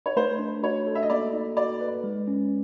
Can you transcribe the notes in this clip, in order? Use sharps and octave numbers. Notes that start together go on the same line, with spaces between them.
C#5
A3 C5
D4
F#4 C#5
A4
E5
D#5
A#3 D5
D#4
F#4 D5
B4
G#3
C#4